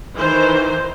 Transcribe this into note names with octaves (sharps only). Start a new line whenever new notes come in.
D#3 E3 C5